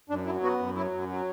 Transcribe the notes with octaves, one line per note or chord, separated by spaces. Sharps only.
F#2 D4
F#3 E4
B3 F#4
F#2
F#3 E4
F#2
F#3